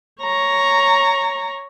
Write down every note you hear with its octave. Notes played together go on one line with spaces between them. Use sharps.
C#5 A#5